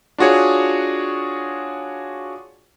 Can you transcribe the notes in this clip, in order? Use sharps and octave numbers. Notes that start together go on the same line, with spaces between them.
D4 F4 F#4 G#4 C#5